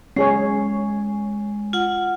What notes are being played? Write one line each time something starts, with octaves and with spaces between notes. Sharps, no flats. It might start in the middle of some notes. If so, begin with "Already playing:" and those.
G#3 C#4 G#4 C#5
F4 F#5